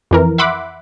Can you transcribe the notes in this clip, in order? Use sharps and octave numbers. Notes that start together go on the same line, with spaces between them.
F2 E3 A#4
E5 F#5 B5 C6 D6